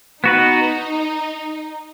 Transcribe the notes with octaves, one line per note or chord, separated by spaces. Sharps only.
B3 D#4 F#4 B4